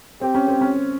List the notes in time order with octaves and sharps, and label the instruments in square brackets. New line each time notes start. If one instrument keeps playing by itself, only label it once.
[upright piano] C4 [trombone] G4
[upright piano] C#4
C4
C#4